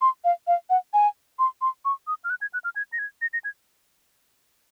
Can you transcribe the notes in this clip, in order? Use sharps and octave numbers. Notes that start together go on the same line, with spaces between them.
C6
F5
F5
F#5
G#5
C6
C6
C#6
D#6
F6
F#6
G#6
F#6
F6
G#6
A#6
G#6
A#6
A#6
G#6